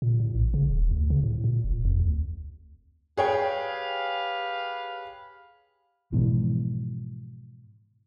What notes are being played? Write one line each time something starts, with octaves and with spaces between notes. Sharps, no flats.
A#2
A2
A1
C#3
D#1
D2
C#3
A2
A#2
F1
F2
D2
G4 G#4 B4 C#5 F5 G5
G#2 B2 E3 F3